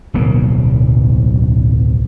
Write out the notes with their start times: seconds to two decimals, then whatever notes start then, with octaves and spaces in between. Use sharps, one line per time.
0.14 D1 B1 A#3